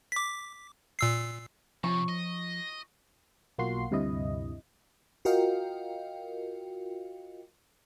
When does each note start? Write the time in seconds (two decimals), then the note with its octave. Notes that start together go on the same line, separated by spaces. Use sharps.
0.12 D6 B6
0.99 A#2 E6 C7
1.84 C3 F3 C#6
2.08 D#5
3.58 B1 A#3 F4 F#4 C6 C7
3.91 D2 G2 C3 E4 D#5
5.25 F4 F#4 A#4 D#5 F5 G5